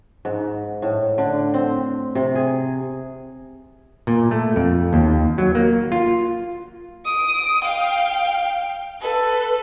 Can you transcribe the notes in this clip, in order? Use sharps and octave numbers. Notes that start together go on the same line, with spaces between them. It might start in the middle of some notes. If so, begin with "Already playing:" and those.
G#2
A2
D3
C4
C3
G#4
A#2
A3
F2
D#2
F#3
A#3
F4
D#6 D7
F5 G5
A4 B4